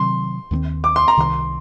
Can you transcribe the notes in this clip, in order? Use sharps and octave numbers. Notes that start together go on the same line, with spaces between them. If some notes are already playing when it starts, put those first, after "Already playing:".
Already playing: C3 D#3 F#3 C4 C6
D#2 D#3 A3 C4
D6
C6
A#5
C2 C3 D#3 C6